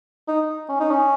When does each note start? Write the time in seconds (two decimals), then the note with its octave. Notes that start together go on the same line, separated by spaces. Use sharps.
0.28 D#4
0.68 C#4
0.80 D#4
0.91 C#4